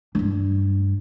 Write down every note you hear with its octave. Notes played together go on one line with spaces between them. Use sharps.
G2 D4